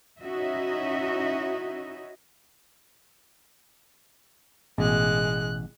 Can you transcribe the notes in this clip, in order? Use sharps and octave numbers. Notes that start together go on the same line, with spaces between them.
C#4 D#4 E4 F#4 D#5 E5
A1 B2 G#3 F#6